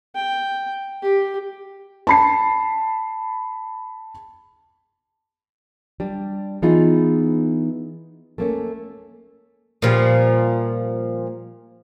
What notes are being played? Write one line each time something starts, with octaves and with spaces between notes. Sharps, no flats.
G5
G4
A5 B5 C7
G3 D4
E3 B3 D#4 F4 G#4
A3 A#3 C#4
A#2 F3 G3